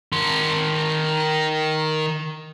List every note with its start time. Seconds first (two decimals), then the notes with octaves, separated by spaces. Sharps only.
0.12 D#3 C6